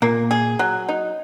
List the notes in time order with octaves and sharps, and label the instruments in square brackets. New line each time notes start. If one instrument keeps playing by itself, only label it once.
[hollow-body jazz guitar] A#2 [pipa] A#3
[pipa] G#4
F#3
D#4